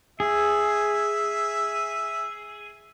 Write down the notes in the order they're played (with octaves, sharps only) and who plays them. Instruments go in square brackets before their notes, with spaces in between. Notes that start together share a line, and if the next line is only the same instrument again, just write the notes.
[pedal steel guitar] G#4 [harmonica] E5